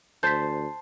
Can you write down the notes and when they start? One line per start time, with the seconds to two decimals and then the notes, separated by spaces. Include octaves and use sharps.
0.23 D2 C5 A5 G6 B6